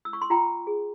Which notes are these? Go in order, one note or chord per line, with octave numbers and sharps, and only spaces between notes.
E6
C#6
C6
F4 G5 A#5
G#4